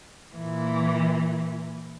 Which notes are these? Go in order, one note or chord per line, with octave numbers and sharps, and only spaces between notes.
A#2 E3